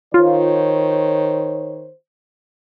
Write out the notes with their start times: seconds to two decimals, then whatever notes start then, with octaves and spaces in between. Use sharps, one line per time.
0.14 D#3 F4 C5 C#5